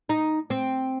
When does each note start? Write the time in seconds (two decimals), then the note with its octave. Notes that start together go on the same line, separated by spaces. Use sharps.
0.09 D#4
0.50 C4